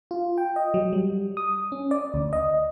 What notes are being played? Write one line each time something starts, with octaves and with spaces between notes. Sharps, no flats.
F4
G5
D#5
F#3
G3
D#6
C#4
D5
D2
D#5